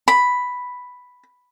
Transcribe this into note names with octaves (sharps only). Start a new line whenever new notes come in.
B5